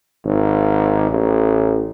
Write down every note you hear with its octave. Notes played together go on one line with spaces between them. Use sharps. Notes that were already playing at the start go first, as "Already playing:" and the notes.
G#1
A1